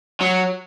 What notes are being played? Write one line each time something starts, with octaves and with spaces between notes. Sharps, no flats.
F#3